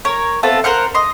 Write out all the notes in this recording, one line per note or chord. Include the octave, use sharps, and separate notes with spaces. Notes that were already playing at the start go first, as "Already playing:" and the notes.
A#4 C#5
B3 C4 F4 A4
A#4 C5 F5 F#5
D#5 C6